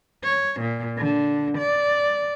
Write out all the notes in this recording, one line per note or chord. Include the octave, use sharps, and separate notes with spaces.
C#5
A#2
D3
D5